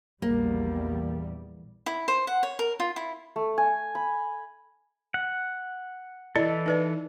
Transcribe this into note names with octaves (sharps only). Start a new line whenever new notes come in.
A#1 E2 G3 A#3
E4
C5
F#5
C#5
A#4
F4
E4
A3
G#5
B5
F#5
E3 E4 A4 D5 D#5
D#4 B4 D5